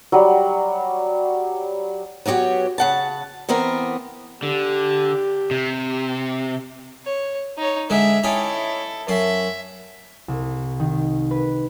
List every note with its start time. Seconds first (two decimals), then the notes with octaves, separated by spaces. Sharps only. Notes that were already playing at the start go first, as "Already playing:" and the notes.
0.12 F#3 G3
2.26 F#3 B3 F#4 G4 C#5
2.78 C#3 F#5 A5
3.49 E3 B3 C4 A#4
4.43 D3 G4
5.51 C3
7.05 C#5
7.58 D#4 C#5
7.90 G#2 D3 G#3 E5
8.24 C#4 D#4 E4 G4 A4
9.08 F#2 E5 C6
10.28 C2
10.79 D#3
11.31 B4